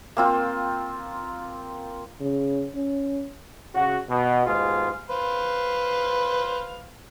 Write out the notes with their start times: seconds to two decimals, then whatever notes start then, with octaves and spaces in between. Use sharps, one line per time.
0.17 A#3 C4 F4
2.21 C#3
2.75 C#4
3.75 C#3 F#4
4.08 B2
4.46 D#2 G#2 B2 F4 G#4
5.10 B4 C5 F5